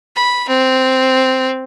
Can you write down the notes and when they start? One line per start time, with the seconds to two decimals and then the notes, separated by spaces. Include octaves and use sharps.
0.15 B5
0.49 C4